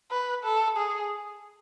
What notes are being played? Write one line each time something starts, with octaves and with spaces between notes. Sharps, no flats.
B4
A4
G#4